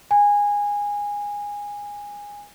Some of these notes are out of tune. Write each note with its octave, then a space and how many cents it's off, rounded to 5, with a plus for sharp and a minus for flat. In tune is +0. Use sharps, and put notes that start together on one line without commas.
G#5 -15